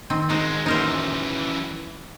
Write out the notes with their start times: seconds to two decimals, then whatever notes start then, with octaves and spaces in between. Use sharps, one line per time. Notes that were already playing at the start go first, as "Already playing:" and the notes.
0.10 D#3 C4
0.30 G#3 C4 D#4 F#4
0.66 F#2 E3 D#4 A#4 C5